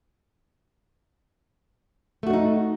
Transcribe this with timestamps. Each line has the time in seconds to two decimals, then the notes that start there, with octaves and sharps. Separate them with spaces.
2.23 A3
2.27 F#4
2.30 D4
2.33 D#4